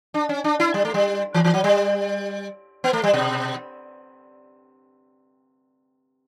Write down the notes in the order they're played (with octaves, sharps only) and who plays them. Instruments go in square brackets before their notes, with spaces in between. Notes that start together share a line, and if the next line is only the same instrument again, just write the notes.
[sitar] D4
C#4
D4
E4
G3
A3
G3
E3
E3
F#3
G3
B3
A3
G3
B2